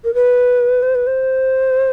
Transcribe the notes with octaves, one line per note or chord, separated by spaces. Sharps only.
A#4
B4
C5
B4
C5